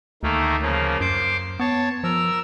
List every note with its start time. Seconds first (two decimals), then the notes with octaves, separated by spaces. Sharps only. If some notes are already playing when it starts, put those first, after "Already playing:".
0.23 D2 D#3 A3 A#3
0.62 C#3 F3 A#3
1.01 F#2 C5 C6 D6
1.59 B3 C#5 A5
2.04 F3 A#4 E6